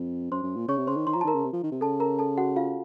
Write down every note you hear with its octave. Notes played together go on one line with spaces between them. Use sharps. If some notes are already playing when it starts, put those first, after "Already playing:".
Already playing: F2
F#2 C5 C6
F#2
A#2
C#3 C#5 C#6
C3
C#3 C5 C6
D#3
D#3 C6
F3 A#5
A5
D#3 A#4 A#5
C#3
C3
F3
D#3
C3
C#3 A4 A5
A#4 A#5
A4 A5
F#4 F#5
F4 F5